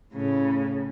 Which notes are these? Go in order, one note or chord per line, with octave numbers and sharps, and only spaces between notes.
A2 C#3